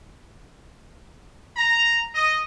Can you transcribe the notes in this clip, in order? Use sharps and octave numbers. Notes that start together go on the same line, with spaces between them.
A#5
D#5